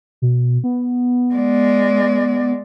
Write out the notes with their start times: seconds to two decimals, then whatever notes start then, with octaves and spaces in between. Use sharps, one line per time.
0.22 B2
0.64 B3
1.35 G#3 D5